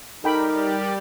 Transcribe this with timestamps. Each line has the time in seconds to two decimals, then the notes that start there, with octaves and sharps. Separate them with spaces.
0.24 G3 D#4 G4 A4 A#4 D5 G5 B5